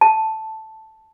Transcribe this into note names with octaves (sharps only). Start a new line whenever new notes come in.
A5